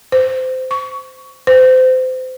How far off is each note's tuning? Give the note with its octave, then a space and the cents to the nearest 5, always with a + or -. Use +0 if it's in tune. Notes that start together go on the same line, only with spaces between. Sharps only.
C5 -20
C#6 +20
C5 -30